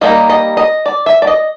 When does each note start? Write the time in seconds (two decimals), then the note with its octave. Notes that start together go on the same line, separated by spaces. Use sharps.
0.01 G3 A#3 D#4 D#5
0.30 D#5
0.57 D#5
0.86 D5
1.06 E5
1.22 D5
1.27 D#5